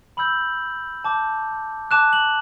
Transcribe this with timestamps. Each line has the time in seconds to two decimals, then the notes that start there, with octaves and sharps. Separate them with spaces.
0.17 B5 E6 G6 F#7
1.05 A5 D6 G6
1.91 A5 D6 F#6 E7
2.13 F#7